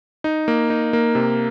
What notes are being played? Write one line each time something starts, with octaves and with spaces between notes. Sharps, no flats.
D#4
A#3
D#4
A#3
C3